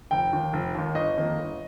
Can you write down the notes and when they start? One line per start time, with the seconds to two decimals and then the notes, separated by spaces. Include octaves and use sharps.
0.11 F1 G5
0.33 D#2 D#3
0.53 F1
0.75 D#2 D#3
0.95 G1 D#5
1.17 F2 D#3 A#3
1.38 G1